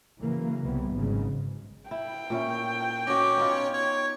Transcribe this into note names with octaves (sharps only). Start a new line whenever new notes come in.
C#3 E3 F#3 A#3
C2 E3 G3 B3
G#1 G#2 C#3 F#3
E4 G5
A#2 C#4 E4
C#4 F#4 C#5 D#5 D6
B3 D#4 F4
C#5 G#6